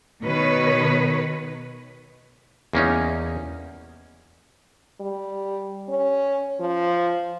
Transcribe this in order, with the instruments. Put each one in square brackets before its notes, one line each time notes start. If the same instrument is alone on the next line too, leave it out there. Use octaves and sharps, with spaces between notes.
[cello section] B2 D#3 B4 C#5
[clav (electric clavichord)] E2 A#3 C#4 D#4
[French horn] G3
C#4
F3